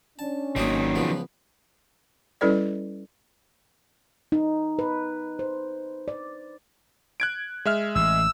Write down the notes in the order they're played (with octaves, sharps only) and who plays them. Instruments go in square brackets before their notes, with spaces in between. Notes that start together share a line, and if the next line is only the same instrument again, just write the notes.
[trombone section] C#4 D4 [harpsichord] A5
[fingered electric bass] G#1 A#3 [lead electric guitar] D#3 F#3 [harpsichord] D#4 C#5 D5
[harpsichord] C#2 F3 B3
[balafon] G3 C#4 E4 A4 B4 D5
[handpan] D#4
B4
C5
D5
[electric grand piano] F#6 G#6 D7
G#3 E5 F6
[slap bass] A1 E3 [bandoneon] E6